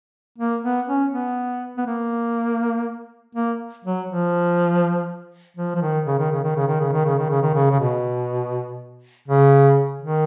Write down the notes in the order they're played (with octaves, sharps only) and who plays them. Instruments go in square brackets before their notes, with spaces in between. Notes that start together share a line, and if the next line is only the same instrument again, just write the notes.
[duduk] A#3
B3
C#4
B3
B3
A#3
A#3
F#3
F3
F3
F3
D#3
C#3
D#3
C#3
D#3
C#3
D#3
C#3
D#3
C#3
D#3
C#3
D#3
C#3
C#3
B2
C#3
D#3